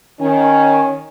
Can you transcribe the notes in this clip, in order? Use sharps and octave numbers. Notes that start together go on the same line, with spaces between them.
D#3 C#4